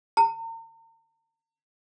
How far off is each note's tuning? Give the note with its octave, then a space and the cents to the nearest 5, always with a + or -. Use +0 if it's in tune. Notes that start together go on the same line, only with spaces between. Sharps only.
A#5 -40